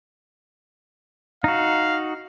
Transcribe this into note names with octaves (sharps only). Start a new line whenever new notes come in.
D#4 F#4 F5